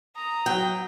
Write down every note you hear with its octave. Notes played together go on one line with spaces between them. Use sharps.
A#5 D#6
F#3 G5